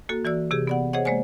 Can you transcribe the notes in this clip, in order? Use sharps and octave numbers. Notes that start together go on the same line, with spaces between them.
A#3 F#4 A4
E3 F#4 D5 E6
C3 G4 G#4
B3 D5 F#5
G#4 C5 C#5 D#5 F#5
G#3 A#3 C5 D5 G#5